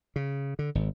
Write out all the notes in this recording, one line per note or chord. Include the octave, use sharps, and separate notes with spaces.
C#3
D3
G#1